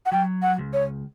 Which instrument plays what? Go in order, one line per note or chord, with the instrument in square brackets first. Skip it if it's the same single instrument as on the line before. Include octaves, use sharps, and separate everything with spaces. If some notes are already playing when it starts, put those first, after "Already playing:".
[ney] F#5
[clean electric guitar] F#3 [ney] G5
[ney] F#5
[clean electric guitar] C#2
[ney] C#5